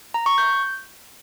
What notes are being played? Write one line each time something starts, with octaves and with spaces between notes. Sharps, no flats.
A#5
C#6
G6